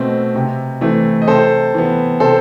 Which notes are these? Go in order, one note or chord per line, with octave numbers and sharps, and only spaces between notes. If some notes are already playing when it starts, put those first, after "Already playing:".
Already playing: B2 A3 C4 B4 D#5
C3
E3 A3 C4
D#5
C3 A4 C5
E3 B3
C3 A4 C5